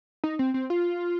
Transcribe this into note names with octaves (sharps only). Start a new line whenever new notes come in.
D#4
C4
C4
F4